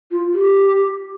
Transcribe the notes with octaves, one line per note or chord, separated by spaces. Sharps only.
F4
G4